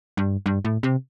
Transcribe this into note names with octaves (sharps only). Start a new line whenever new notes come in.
G2
G2
A2
C3